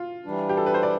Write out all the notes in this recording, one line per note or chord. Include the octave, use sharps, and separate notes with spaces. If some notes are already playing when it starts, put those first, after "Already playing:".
Already playing: F4
E3 G3 D4
G4
A4
B4
C5
D5